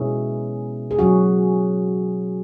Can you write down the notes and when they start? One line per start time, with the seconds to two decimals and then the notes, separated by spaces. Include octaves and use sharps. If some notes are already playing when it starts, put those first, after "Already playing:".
Already playing: B2 G#3 C#4 E4 G#4
0.91 G#4
0.99 F#3 C#4 F#4